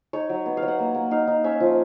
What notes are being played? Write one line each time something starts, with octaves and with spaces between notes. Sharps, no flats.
D#4 C#5
F#3
B3
F5
F#3
F#5
A#3
A#3
D#4 F5
D#4
C#4 E5
F3